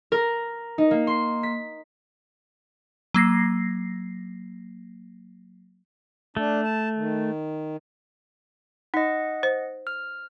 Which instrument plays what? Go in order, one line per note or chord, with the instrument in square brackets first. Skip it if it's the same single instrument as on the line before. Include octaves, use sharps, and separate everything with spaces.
[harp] A#4
D#4
A#3
C6
B6
[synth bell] F#3 A#3 A#6 C7
[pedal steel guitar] A3 [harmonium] D4
[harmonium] A5
D#3
[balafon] D#4 [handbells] D#5 F#5
[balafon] C5
[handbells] F6